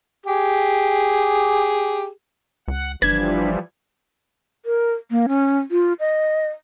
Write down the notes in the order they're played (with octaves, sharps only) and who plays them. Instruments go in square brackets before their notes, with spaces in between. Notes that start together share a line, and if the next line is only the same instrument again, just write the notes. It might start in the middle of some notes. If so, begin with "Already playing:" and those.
[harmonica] G4 G#4
[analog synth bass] C#2 [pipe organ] F#5
[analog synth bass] G1 [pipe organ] E3 F3 G3 [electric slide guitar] D4 B4 [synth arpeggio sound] G#6
[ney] A#4
A#3
C#4
F4
D#5